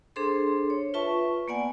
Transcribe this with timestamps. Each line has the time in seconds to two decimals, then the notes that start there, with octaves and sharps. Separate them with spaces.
0.16 D4 G#4 A4 C5 C6
0.70 C#5
0.94 F4 B4 E5 A5 C#6
1.48 A#3 B3 D5 F#5 G#5